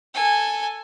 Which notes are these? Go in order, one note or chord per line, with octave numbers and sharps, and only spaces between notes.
A4 G#5